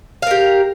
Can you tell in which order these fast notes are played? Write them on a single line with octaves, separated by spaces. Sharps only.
F5 A#4 G4